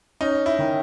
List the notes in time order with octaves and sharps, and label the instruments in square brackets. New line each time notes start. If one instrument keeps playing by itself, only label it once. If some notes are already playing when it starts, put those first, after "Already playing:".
[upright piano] C#4 [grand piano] D#4
[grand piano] E4
[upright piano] D#3